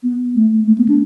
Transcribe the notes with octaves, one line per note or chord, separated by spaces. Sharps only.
B3
A3
A3
B3
D4